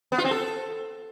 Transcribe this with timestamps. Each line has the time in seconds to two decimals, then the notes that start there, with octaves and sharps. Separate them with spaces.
0.12 B3
0.18 F4
0.25 C4
0.31 A4